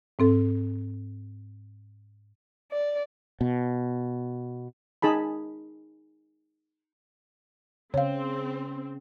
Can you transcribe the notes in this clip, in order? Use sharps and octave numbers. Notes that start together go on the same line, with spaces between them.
G#2 C4 A4
D5
B2
D#4 G#4 A5 B5
C#3 C4 C#5 F5